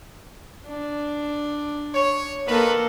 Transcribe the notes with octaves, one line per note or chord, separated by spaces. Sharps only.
D4
C#5
D#3 A#3 A4 B4